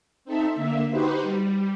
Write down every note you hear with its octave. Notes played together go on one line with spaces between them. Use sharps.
C4 D#4 A4 E5
D3 A#3 E5
D#4 F#4 G4 B4 C5
G3